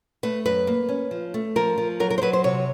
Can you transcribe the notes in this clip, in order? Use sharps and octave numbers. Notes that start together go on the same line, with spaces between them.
A3 B4
F#2 B4
A#3
C#4
F3
A3
F3 A#4
F3
F#3 A#4
A#4
C5
F#3 B4
C5
C3 C#5